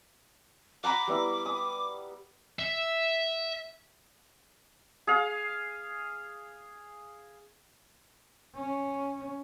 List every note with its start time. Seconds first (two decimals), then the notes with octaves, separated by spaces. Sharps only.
0.84 F#5 A#5 B5 D6
1.08 G3 B3 E4
1.46 D#6
2.59 E5
5.07 G#4 F5
8.55 C#4